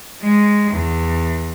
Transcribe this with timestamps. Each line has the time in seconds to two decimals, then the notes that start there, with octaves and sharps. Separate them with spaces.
0.22 G#3
0.72 E2